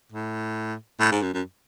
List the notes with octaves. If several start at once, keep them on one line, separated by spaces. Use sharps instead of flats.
A2
A2
G#2
F#2
F#2